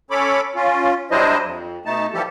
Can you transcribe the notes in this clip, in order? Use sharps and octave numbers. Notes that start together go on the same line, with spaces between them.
C#4 A4 C#5 B5 D6
C#4 F4
F#3 G3 D4 E4 C5 D#5
F2
B2 A3 D#4 A5
E3 F3 G3 G4 A4